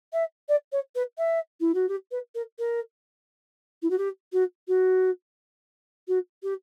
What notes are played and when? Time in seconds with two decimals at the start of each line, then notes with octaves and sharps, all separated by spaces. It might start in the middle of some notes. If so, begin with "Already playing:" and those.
0.13 E5
0.48 D5
0.72 C#5
0.95 B4
1.18 E5
1.60 E4
1.74 F#4
1.88 G4
2.11 B4
2.34 A#4
2.58 A#4
3.82 E4
3.90 F#4
3.98 G4
4.32 F#4
4.67 F#4
6.07 F#4
6.43 G4